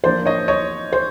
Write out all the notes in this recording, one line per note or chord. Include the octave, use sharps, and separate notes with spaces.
F3 A#3 D4 C5 D5
C#5 D#5
C#5 D#5
C5